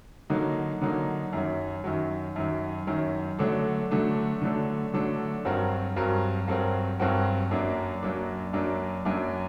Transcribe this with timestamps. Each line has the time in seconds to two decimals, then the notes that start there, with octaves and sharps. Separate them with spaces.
0.30 D3 F#3 A#3 D#4
0.82 D3 F#3 A#3 D#4
1.33 F#2 D#3 F#3
1.84 F#2 D#3 F#3
2.36 F#2 D#3 F#3
2.87 F#2 D#3 F#3
3.39 D3 F#3 A3 D4 A4
3.91 D3 F#3 A3 D4 A4
4.42 D3 F#3 A3 D4 A4
4.94 D3 F#3 A3 D4 A4
5.45 G2 F#3 C4 F#4 A#4
5.96 G2 F#3 C4 F#4 A#4
6.48 G2 F#3 C4 F#4 A#4
7.00 G2 F#3 C4 F#4 A#4
7.51 F#2 F#3 A#3 D4
8.03 F#2 F#3 A#3 D4
8.53 F#2 F#3 A#3 D4
9.05 F#2 F#3 A#3 D4